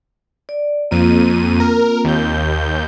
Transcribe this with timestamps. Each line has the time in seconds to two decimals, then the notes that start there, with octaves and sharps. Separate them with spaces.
0.49 D5
0.91 F2 A#3 C4 F4 D#7
1.60 A#4
2.04 D#2 G6